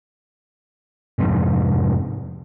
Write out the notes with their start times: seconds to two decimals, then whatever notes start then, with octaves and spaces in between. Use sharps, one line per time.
1.19 F2 G#2 C3